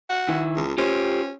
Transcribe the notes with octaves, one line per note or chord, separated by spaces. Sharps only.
F#4
D#3 E4
C#2
C#4 F4 G4 C5